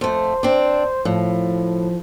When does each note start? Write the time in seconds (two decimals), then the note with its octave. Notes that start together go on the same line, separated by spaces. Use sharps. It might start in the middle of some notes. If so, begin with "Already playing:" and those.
0.01 F2 A3 C5
0.43 C4 D4
1.05 A2 F3